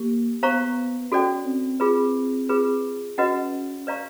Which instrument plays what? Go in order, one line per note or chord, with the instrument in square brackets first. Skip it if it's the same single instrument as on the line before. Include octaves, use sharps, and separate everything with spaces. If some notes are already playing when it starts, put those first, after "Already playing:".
Already playing: [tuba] A#3 [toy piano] G4
[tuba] B3 [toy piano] C5 F5 A#5 C#6
[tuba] C#4 [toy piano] F#4 A4 D5 G5
[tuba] C4
[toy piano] F4 G#4 B4
F4 G#4 B4
[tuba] C#4 [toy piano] F#4 B4 D#5 F#5
[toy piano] B4 D5 F5 A#5 C#6